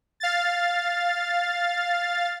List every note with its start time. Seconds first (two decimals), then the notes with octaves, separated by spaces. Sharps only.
0.20 F5 A6